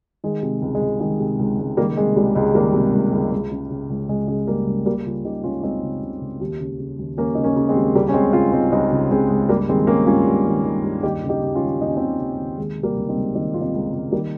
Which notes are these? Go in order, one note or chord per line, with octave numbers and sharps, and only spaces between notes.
D#3 G#3
C3
C#2
G#3
C#2
D#3 G#3
C3
C#2
C#2
D#3 G3 A#3
C3 G#3
C#2 G3
C#2 G#3
D#3 G3 A#3
C3
C#2
C#2
C#2
C#3
C#3
C#2
C#2 G#3
C#3 G#3
C#3 G3 A#3
C#2
C#2 G3 A#3
C#3 C#4 F4
C#3 D#4 G4
C#2 C#4 F4
C#2 C4 D#4
C#3
C#3
C#2
D#2
C#3
C#3
D#2
D#2 A#3 C#4
C#3 D#4
A#3 C#4
C#3
G#3 C4
D#2
C#2 G3 A#3
C#4
C#3 G#3 C4
C#3 C#4 F4
C#2 C4 D#4
C#2 C4 D#4
C#3
C#3 G#3 C4
C#2
G2 G3 A#3
D#3 G#3 C4
D#3 A#3 C#4
G2 C#4 F4
G2
D#3
D#3
G2
D#2 D#4 G4
C#3
D#4 G4
C#3
C#4 F4
D#2
D#2 D#4
C#4
C#3 C4 D#4
C#3
D#2
D#3 G#3
C3
G3 A#3
C#2
C4 D#4
C#2
D#3 C4 D#4
C3 F4
C4 D#4
C#2
C#2
D#3 G3 A#3